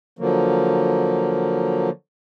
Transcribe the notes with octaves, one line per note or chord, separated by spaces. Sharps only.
D3 F3 F#3 A#3